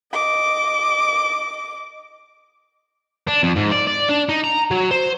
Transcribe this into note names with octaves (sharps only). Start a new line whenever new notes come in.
D#5 D6
D4
F2
G#2
D5
D5
D4
D#4
A#5
F#3
C5